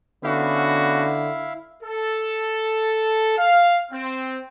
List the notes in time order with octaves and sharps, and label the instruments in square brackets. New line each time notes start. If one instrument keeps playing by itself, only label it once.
[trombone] D3 [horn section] B3 C#4 F#4 [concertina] E4 E5 F5
[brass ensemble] A4
F5
C4